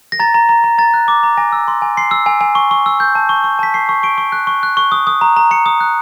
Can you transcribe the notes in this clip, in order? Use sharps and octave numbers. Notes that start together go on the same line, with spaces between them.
A#6
A#5 A6
A#5
A#5
A#5
A#5 A6
F#6
D6
A#5
G#5 A#6
E6
C6
G#5
C6 C7
E6
G#5
G#5
C#6
C#6
E6
G6
A5
C#6
C#6
A5 B6
C#6 C7
C#6
C#6 D7
C#6
F#6
C#6
F#6
C#6
D#6
D#6
A#5
A#5
A#5 C#7
D#6
F#6